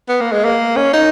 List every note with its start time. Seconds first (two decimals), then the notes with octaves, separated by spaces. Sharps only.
0.09 B3
0.21 A#3
0.32 G#3
0.44 A#3
0.76 C#4
0.93 D#4